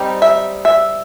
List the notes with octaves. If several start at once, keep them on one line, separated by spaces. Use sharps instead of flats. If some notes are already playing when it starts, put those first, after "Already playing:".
Already playing: G3 C4 D#4
E5
E5